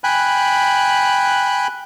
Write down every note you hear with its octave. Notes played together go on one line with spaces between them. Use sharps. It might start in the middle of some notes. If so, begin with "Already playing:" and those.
G5 G#5 B5 F#6